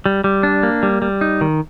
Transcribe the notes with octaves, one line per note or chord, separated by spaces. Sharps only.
G3
G3
D4
A#3
G3
G3
D#4
D#3